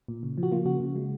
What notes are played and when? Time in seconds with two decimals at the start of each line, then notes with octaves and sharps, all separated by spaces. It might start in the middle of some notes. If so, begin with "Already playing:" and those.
0.08 A#2
0.23 C#3
0.38 F3
0.43 F#4
0.52 A#3 F4
0.66 C#3 F#4
0.80 C#3
0.96 G#3